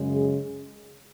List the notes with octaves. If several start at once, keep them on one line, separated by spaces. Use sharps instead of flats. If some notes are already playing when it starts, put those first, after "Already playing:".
Already playing: F#2 C#3 G#3
G#4